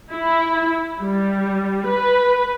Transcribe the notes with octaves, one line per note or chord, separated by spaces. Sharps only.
E4
G3
B4